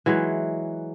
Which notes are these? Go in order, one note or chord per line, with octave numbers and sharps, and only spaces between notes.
E3 F#3 G#3